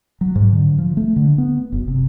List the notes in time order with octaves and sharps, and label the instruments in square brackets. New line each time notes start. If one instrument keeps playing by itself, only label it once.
[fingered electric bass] F#3
G#2
D3
F3
A3
D3
B3
F#1
C3